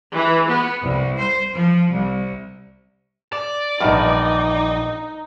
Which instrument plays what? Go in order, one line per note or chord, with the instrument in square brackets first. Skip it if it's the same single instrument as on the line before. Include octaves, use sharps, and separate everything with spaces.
[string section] E3
B3
C2
C5
F3
C2
[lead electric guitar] D5
[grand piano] A#1 D#5 F6 [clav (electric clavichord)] E2 G2 [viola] D#4